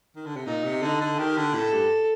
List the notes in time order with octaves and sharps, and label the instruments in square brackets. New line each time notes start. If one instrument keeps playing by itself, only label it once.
[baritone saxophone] D#3
D3
C3
[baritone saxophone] A#2 [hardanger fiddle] D#4
[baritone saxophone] C3
[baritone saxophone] D3 [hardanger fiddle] D#4
[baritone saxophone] D3
[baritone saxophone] D#3 [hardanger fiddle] G4
[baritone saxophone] D3
[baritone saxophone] A2 [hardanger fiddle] A4
[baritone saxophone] G2